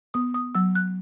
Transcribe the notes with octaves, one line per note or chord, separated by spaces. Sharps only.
B3 D#6
D#6
F#3 E6
F#6